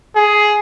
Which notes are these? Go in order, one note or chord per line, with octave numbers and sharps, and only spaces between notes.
G#4